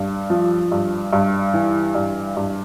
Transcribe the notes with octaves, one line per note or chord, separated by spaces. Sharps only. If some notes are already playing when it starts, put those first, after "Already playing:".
Already playing: G2
F3
G2
G2
E3
G2
G2